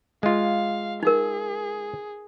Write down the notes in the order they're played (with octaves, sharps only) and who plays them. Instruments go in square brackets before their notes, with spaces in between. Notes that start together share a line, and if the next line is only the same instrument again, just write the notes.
[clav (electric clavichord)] G#3 F4 [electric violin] F5
[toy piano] D#4 A#4 [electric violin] G#4